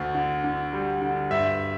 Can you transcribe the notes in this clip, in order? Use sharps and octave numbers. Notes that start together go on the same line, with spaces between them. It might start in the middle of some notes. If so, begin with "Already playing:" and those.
Already playing: D2 D3
D3
D3
G3
D3
G2 E5